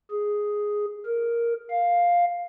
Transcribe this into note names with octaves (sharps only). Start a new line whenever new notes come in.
G#4
A#4
F5